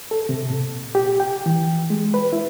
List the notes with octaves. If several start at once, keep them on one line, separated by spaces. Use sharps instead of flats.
A4
C3
A#2
G4
G5
E3
G#3
B4
E4